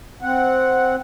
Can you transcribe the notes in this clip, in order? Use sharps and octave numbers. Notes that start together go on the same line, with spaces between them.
C4 F#5